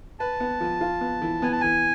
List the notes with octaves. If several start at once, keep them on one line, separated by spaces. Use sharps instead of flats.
B4 A5
B3
F3
F4
B3
E3
B3 G#5
A5
E3 G#5